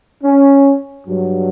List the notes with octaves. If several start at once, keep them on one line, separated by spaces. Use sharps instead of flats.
C#4
G2 F#3